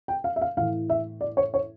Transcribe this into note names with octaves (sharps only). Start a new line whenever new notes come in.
G5
F5
E5
F5
A2 E3 F5
E5
D5
C#5
C#5